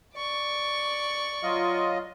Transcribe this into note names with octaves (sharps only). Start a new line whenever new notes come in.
D5 C#6
F#3 F4 D#5